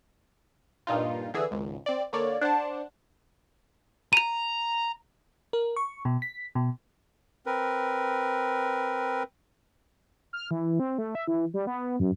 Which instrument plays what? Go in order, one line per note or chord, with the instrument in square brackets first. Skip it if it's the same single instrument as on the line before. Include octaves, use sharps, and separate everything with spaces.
[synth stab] G2 A#2 D#4 F4
D3 E3 G#4 E6
G#1 C#2
C4 D5
D3 A#3 C#5 D5
D4 C5 F#5 A5
[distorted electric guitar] A#5 [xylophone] D#7 F7
[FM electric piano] A#4
C#6
B2
B6
B2
[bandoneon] C4 A#4 B4
[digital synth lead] F6
E3
C4
A3
E5
E3
G3
B3
F#2